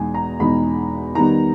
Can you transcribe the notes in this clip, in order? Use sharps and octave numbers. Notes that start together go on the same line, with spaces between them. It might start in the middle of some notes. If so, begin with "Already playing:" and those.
Already playing: E2 B2 G#3 D#4 G#5
A#5
E2 B2 G#3 D#4 B5
D#3 G3 B3 D#4 A#5